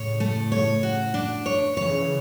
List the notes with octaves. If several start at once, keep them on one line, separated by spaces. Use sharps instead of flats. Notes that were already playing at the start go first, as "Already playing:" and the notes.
Already playing: A2 C#3 C#5
A3
C#5
F#4
D4
C#5
C#3 E3 C#5